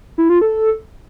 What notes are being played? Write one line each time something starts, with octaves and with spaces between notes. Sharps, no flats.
E4
F4
A4